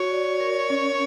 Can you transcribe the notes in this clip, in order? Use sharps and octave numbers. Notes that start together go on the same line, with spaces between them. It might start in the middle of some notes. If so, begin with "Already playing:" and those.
Already playing: F#4 C#5
D5
A#4
C#4